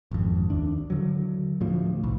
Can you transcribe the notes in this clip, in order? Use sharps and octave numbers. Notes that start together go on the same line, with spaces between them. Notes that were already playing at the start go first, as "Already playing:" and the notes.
G#1 F2
D#2 D4
D3 F#3
D2 A2 F3
B1